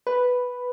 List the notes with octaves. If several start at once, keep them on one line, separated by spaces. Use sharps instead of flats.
B4